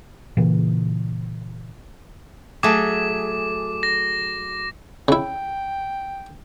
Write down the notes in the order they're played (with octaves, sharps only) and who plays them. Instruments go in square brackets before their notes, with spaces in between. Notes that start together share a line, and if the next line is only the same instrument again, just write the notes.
[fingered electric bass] A#2 C#3 E3
[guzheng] F#3 A3 [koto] G#4 [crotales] D6
[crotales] A#6
[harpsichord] C#3 E4 [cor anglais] G5